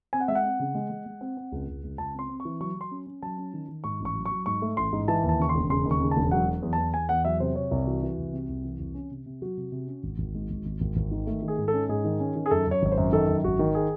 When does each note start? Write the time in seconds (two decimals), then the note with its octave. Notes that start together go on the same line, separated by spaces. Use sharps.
0.13 C4 G#5
0.20 F#5
0.28 G#3 E5
0.35 F#5
0.44 C4
0.60 C#3
0.75 G#3
0.90 G#3
1.06 G#3
1.21 C4
1.37 C4
1.52 C#2
1.68 C#2
1.83 C#2
1.98 C#2 A5
2.14 C4 C6
2.29 C4
2.40 C#6
2.45 E3
2.60 F#3 C#6
2.76 F#3 C6
2.91 C#4
3.07 C#4
3.22 F#3 A5
3.38 C#4
3.54 D#3
3.68 D#3
3.84 G#2 C#6
4.00 A1
4.05 C#6
4.15 F#3
4.25 C#6
4.31 F#3
4.46 G#2 C#6
4.62 A3
4.77 A1 C6
4.93 G#2
5.08 E3 A5
5.23 D#2
5.29 A5
5.39 C#3 C#6
5.49 C6
5.54 E1
5.70 C#3 C6
5.86 D#2
5.91 C#6
6.01 C#3
6.11 A5
6.16 E1
6.31 F#3 F#5
6.47 F#3
6.62 E2
6.73 A5
6.78 E2
6.94 E2 G#5
7.09 E2 F#5
7.25 F#3 E5
7.40 C3 C5
7.56 C3 C#5
7.71 C2
7.86 E3 F#4
8.02 E3
8.18 C2
8.33 C3
8.48 C2
8.64 E3
8.79 C2
8.94 C#4
9.10 C3
9.26 C3
9.42 F#3 F#4
9.57 C3
9.72 C3
9.87 C#4
10.03 G#1
10.18 G#1
10.35 G#2
10.50 G#1
10.65 G#1
10.81 G#1
10.96 G#1
11.11 D#3
11.27 A3
11.42 D#3
11.48 G#4
11.58 G#2
11.68 A4
11.73 C#4
11.89 G#2 G#4
12.05 D#3
12.20 C#4
12.36 D#3
12.46 G#4
12.51 F#2 A4
12.67 F#2 C#5
12.82 G#1 C#5
12.92 C5
12.97 F#2
13.13 D#3 A4
13.28 F#2
13.44 G#1 F#4
13.59 D#3
13.75 G#4